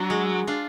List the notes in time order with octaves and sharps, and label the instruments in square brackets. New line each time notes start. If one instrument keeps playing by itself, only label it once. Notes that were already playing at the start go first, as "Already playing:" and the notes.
Already playing: [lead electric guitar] F#3 [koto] D4 F#4
[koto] G#3
D4 F4